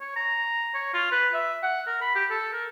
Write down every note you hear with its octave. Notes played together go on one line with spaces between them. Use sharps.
C#5
A#5
C#5
F4
B4
E5
F#5
A#4
B5
G4
A4
A#4